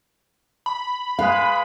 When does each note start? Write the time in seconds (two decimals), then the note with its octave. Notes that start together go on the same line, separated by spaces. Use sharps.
0.66 B5
1.19 G#3 B4 F5